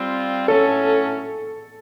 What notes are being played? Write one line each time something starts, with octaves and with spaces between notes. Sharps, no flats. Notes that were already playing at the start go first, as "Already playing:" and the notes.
Already playing: G3 C4 F4
A2 F#3 A3 C#4 A4